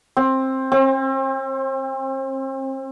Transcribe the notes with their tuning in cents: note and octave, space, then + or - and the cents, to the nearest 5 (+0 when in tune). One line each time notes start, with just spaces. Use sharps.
C4 +15
C4 +40